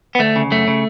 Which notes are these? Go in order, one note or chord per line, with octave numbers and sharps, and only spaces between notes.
B3
D2 A3
C#3
F#2 A3
C#3